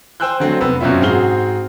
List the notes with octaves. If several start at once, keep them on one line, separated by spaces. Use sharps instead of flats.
C5 G5 G#5 E6 F#6 G6
D3 F#3 A3 C4
F1 B3 E6
F#2 B2 C4 C#4 F4 E5
G#2 C4 F#4 G#4 F6 G7